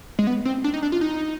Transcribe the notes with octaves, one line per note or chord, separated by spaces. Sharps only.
G#3
B3
C4
D4
D#4
D4
F4
D#4